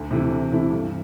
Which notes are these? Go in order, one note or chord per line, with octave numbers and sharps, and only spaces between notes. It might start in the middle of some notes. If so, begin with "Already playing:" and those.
Already playing: D2
C3 E3 A3 E4
D2
C3 E3 A3 E4
G2